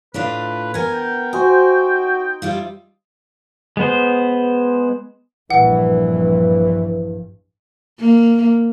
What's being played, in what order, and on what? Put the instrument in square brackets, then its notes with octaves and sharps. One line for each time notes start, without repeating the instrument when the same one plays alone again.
[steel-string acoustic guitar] A2 D4 F4 [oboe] B4
[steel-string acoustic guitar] B3 A#4 [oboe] G#5
[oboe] G5
[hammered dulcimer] D#4 C5 [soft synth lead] F#4 [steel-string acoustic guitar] G#5
[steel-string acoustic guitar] G3 E4 F4
[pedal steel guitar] G#3 B3 C5
[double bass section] A#1 G2 [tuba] E3 [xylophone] F#5
[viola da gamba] A#3